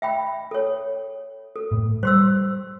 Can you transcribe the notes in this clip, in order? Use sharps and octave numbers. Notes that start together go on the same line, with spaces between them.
E5 G5 B5
A4 C#5
A4
A2
G3 C5 C6 E6